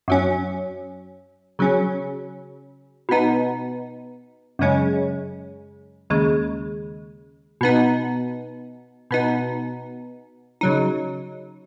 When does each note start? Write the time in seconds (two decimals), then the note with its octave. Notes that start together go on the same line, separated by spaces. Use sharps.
0.08 F#2 F#3 C#4
1.59 C#3 F#3 C#4
3.09 B2 B3 D#4
4.59 F#2 C#3 G#3 C#4
6.10 D#2 C#3 G#3
7.61 B2 B3 D#4
9.11 B2 B3 D#4
10.61 C#3 F#3 D#4